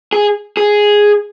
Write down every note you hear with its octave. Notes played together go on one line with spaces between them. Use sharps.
G#4
G#4